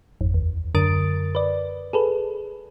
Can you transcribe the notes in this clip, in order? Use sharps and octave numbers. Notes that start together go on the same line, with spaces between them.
G#1 F2
D#2
F#2 D3 A#4 D#6 A6 D7
B4 D5
G#4 A4 B4